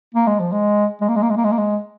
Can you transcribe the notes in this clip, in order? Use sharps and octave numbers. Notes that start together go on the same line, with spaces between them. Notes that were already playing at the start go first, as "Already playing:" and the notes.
A#3
G#3
F3
G#3
G#3
A#3
G#3
A#3
G#3
A#3
G#3
A#3
G#3